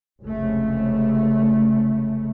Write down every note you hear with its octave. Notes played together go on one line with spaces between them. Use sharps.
F1 C#2 C#3 A3